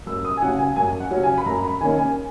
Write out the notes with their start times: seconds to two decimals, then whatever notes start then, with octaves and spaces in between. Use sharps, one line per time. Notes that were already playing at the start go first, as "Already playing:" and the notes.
0.07 F#2 E6
0.25 D#6
0.37 G#5
0.42 C#3 F#3 C#4 F#5
0.59 G#5
0.76 F#2 G#5
1.00 F#5
1.11 C#3 F#3 C#4
1.23 G#5
1.38 B5
1.46 F#2 A#5
1.64 B5
1.81 D#3 A#3 C#4 G#5
1.98 G#5